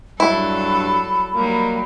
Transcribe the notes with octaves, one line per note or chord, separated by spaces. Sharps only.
G2 F#3 G3 E4 A4 B5
F#3 G3 A#3 D#4